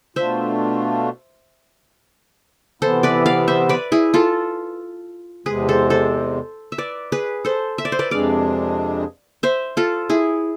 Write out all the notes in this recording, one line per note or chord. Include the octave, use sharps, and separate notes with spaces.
B2 A3 D4 F4 C5 E5
C3 E3 B3 E4 A4 C5
B4 D5
D5 F5
C5 E5
B4 D5
E4 G#4
F4 A4
E2 C3 G#3 G#4 B4
A4 C5
A4 C5
E5
B4 D5
G#4 B4
A4 C5
E5
D5
C5
B4 D5
F2 C3 G#3 D4 G#4 D5 F5
C5 E5
F4 A4
E4 G#4